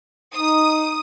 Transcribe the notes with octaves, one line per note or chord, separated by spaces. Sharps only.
D#4 D#6